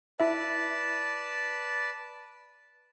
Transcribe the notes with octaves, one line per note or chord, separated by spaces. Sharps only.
E4 B4 D5 E5 A5